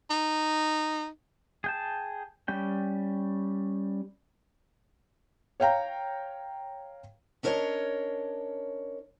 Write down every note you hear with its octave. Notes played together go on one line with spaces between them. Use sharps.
D#4
G#4 G5 A5
G3 C#4 G5
C#5 F5 G5 A#5
C#4 D4 A#4 C5 C#5 D#5